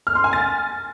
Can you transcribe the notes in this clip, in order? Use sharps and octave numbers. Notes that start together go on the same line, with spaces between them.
F6
C6
G#5
A6